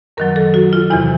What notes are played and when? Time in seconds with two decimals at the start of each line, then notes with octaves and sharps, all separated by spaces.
0.17 F#2 D#3 F#3 A#4
0.36 A4
0.54 F#4
0.73 F4
0.90 E2 C3 E3 E4